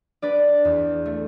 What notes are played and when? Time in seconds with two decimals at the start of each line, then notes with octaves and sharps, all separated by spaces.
0.22 D4 B4 D5
0.65 E2
1.06 A3